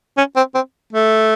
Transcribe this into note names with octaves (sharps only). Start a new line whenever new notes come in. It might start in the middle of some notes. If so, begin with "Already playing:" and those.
C#4
C4
C4
A3